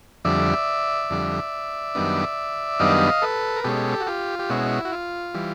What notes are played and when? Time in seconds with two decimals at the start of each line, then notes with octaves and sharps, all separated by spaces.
0.25 F2 D3 G3 D5 E5
1.10 F2 D3 G3
1.95 F#2 D#3 G3 B3 D4
2.80 F#2 D#3 G3 B3 D4 D#5 F5
3.22 A4 B4
3.56 A#4
3.64 B2 G#3 C#4 G4 A4
4.01 F#4
4.07 F4 G4
4.39 G4
4.50 B2 G#3 C#4 E4 F#4
4.85 F#4
4.92 F4
5.35 E3 G3